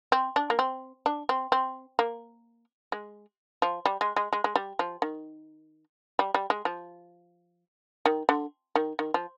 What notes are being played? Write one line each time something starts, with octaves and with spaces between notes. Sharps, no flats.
C4
D4
A#3
C4
D4
C4
C4
A#3
G#3
F3
G3
G#3
G#3
G#3
G#3
G3
F3
D#3
G3
G3
G#3
F3
D#3
D3
D#3
D#3
F3